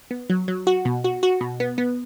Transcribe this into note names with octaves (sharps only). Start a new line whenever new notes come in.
B3
F#3
F#3
F#4
B2
F#4
F#4
B2
B3
B3